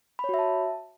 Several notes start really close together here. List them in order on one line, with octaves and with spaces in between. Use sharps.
B5 C#5 F#4 E5 A5